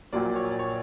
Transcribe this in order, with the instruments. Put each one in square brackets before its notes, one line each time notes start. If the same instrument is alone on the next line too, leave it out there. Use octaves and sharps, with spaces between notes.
[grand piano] A#1 A#2 F#3 A#3 [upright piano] D5
[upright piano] C#5
D5
C#5